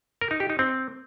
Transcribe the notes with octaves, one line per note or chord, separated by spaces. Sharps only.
A#4
D#4
G4
D#4
C4